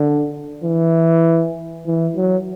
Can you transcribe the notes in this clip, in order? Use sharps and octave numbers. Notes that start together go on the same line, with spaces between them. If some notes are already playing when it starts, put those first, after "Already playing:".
Already playing: D3
E3
E3
F#3